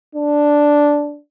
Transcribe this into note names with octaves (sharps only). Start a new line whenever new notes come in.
D4